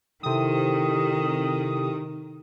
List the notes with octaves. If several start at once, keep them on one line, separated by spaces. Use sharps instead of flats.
C3 D#3 E4 A4 G5 D#6